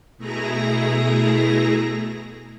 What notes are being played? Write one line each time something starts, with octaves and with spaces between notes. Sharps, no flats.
B2 A3 E4 G#4 A#5 A#6